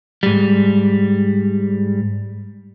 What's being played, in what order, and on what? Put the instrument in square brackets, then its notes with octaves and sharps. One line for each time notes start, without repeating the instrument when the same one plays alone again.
[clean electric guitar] G#2 G3